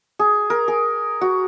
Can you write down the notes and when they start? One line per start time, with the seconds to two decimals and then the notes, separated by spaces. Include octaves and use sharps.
0.19 G#4
0.50 A#4
0.68 G#4
1.21 F#4